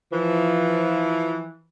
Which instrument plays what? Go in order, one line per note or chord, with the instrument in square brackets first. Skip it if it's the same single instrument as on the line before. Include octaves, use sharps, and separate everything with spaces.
[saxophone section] E3 F3